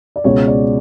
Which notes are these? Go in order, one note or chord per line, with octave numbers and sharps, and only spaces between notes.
D5
C#2 B2 G#3 C#5
D5